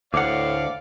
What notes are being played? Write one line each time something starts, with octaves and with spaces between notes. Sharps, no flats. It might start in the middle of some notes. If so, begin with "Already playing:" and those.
D2 A2 D5 F5 F#5 D6